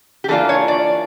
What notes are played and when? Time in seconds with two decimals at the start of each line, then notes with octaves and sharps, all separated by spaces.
0.24 G4
0.28 E3 A#3 D4 F4 A4
0.49 C#5
0.68 D5